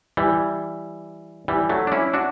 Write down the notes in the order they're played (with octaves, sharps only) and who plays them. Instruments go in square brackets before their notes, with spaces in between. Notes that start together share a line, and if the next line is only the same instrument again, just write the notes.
[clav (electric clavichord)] E3 G3
E3 G3
F#3 A3
D4
C#4 E4
D4 F#4